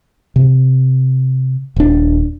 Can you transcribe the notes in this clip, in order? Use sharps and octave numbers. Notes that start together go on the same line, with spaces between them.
C3
D#1 D4